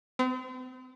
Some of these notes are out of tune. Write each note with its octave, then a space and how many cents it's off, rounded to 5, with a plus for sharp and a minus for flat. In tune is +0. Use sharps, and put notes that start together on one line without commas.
C4 -40